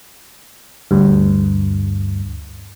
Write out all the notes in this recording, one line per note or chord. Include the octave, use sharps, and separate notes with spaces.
D2 G2